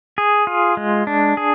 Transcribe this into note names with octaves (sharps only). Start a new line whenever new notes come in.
G#4
F4
G#3
D4
G#4